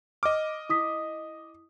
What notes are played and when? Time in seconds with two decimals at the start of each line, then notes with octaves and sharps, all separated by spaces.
0.23 D#5 D6 F6
0.69 E4 D#6 B6